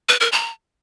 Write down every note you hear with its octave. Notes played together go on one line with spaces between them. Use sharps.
B4
A#4
A#5